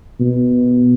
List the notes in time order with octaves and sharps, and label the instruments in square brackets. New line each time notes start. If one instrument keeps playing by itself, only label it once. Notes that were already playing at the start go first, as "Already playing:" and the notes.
[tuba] B2